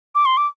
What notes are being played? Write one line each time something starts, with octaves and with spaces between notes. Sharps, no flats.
D6
C6
D6